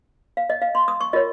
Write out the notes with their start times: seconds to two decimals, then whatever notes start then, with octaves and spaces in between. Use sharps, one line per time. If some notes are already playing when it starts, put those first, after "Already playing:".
0.37 F5
0.50 D#5
0.62 F5
0.75 C6
0.88 D#6
1.01 C#6
1.13 F4 A#4 C#5 D#5